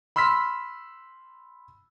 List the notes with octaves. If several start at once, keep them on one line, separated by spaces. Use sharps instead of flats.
B5 C6 E6 F6 B6